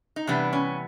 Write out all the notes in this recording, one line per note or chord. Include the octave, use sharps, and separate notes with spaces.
D#4
C3 E3 G3 B3 D4
C#4